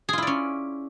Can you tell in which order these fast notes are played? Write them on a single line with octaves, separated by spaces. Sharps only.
G#4 F4 E4 D5 C#4